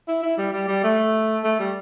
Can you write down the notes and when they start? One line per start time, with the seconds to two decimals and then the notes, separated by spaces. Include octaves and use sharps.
0.08 E4
0.23 E4
0.38 G3
0.53 G3
0.68 G3
0.84 A3
1.44 A3
1.59 G3